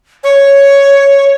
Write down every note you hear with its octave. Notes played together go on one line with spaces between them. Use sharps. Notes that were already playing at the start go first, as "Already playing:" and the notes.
C#5